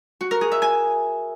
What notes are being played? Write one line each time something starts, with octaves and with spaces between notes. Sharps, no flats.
F#4
A#4
G#4
E5
G#5